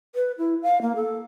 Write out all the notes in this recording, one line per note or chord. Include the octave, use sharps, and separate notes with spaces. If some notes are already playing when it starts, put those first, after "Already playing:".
B4
E4
F5
A#3
A4